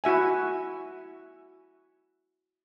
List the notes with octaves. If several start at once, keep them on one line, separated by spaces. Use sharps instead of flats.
E4 F#4 E5 G#5